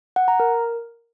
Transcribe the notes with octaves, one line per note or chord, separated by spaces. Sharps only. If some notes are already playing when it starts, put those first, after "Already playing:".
F#5
A#5
A#4